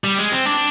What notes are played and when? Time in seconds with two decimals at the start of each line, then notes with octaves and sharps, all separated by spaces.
0.04 G3
0.18 G#3
0.32 C4
0.46 D4